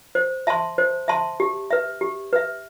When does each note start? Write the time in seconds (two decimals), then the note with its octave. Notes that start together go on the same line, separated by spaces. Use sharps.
0.15 C5
0.47 E5 A5 C6
0.78 C5
1.08 E5 A5 C6
1.40 G4
1.71 B4 E5
2.01 G4
2.33 B4 E5